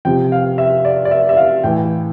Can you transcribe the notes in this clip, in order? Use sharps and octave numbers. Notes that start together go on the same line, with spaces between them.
C3 F3 G5
F5
E5
D5
D5
E5
E5
F5
A2 E3 G5